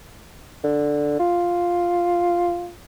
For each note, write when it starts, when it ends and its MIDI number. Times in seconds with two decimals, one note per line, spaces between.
0.64 1.16 50
1.19 2.71 65